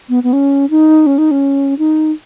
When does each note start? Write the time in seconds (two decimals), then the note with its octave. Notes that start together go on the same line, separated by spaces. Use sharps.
0.09 B3
0.23 B3
0.33 C#4
0.70 D#4
1.06 C#4
1.18 D#4
1.31 C#4
1.79 D#4